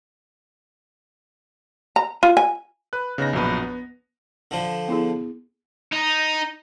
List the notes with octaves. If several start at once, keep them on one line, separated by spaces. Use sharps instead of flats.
A#5
F4
G#5
B4 F#6
C#3 B3 D#4 A#6
A#1 F#2 B2 B4
B3
D3 F3
B3 E4 G#4
D#4